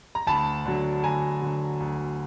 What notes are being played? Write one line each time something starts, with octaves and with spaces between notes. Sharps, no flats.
A#5
D2 A5 B5
D3 F#3
D2 G#5 A#5
D3 F#3
D2